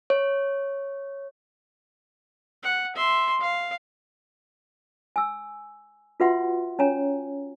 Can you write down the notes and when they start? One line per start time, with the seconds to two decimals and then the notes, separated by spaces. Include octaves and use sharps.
0.10 C#5
2.64 F#5
2.96 E5 C6
3.41 F5
5.16 G#5 E6
6.20 F4 F#4 B4 E5 F#5 C6
6.79 C#4 C#5 G#5 A#5